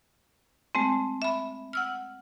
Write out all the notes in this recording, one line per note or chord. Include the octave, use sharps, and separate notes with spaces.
G#3 A3 C4
E5 B5
F#5 E6 F6